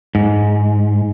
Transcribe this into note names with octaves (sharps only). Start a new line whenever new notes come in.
G#2